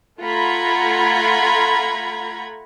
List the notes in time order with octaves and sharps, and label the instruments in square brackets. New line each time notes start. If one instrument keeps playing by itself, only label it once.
[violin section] A3 F4 F#5 A#5 B5 G#6